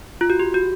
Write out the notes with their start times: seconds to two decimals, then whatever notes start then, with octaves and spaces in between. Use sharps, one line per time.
0.21 F4
0.30 F#4
0.40 G4
0.54 F#4